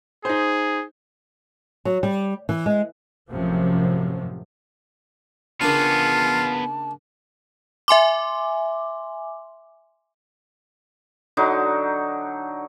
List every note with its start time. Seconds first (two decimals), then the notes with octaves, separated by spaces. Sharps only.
0.25 D#4 G#4 C5
1.85 F#3
2.03 G3
2.49 E3
2.66 G#3
3.30 A1 F#2 C3 F3
5.61 C#3 A#3 B3 D4 F4 G#4 A5
7.88 E5 G#5 C6 D6
11.37 D3 F#3 D#4